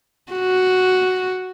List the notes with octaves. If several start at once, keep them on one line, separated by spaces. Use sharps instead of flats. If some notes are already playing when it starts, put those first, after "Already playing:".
F#4